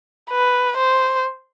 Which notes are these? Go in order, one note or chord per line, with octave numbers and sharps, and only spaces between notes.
B4
C5